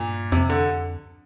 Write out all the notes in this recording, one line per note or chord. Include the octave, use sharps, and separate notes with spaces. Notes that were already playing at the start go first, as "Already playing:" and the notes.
Already playing: G2 A#2
F2 C3
D3